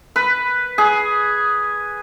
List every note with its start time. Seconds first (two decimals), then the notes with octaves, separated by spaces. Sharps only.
0.16 B4
0.78 G#4